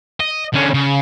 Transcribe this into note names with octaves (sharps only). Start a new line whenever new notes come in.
D#5
D3 C#4
C#3